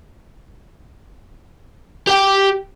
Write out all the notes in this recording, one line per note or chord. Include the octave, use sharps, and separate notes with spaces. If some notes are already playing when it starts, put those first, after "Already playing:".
G4 G5